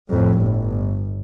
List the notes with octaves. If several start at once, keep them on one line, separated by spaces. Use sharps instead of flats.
F2 A2
G1